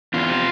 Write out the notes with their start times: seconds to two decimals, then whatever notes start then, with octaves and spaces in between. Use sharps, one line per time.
0.14 E2 F4
0.29 C3